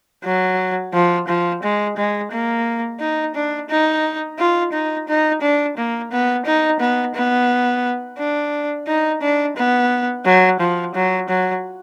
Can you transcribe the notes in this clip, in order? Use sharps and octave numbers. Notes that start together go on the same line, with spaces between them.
F#3
F3
F3
G#3
G#3
A#3
D#4
D4
D#4
F4
D#4
D#4
D4
A#3
B3
D#4
B3
B3
D4
D#4
D4
B3
F#3
F3
F#3
F#3